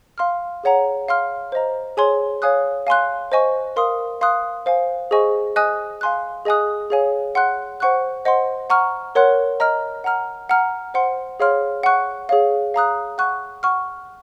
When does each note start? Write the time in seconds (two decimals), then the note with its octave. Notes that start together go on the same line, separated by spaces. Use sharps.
0.18 F5 C6 F6
0.64 G#4 C#5 F#5 A#5
1.08 F5 C6 F6
1.52 C5 D#5 A#5
1.97 G#4 C#5 G#5 C6
2.42 C#5 F5 G#5 D#6 F#6
2.87 F5 G#5 C6 F#6
3.32 C5 D#5 G#5 C#6
3.76 A#4 F5 C6 D#6
4.21 F5 C6 D#6 F#6
4.66 C5 F5 G#5
5.11 G#4 C5 D#5 G#5 C#6
5.56 D#5 G#5 D#6 F#6
6.01 F5 G#5 C6 F#6
6.45 G#4 D#5 G#5 D#6 F#6
6.90 G#4 C#5 F5 G#5
7.35 F#5 C6 F#6
7.80 C5 F#5 C#6 F#6
8.25 C5 D#5 F#5 C6
8.70 F#5 A#5 C#6 F6
9.15 A#4 C#5 F#5 C6 F#6
9.60 D#5 A#5 F6
10.04 F#5 A#5 F6
10.49 F#5 A#5 F6
10.94 C5 F#5 C6
11.40 G#4 C#5 F5 C6 F6
11.83 F#5 C#6 F#6
12.29 G#4 C#5 F5
12.74 F5 A#5 D#6 F#6
13.18 F#5 C#6 F#6
13.63 F#5 C#6 F6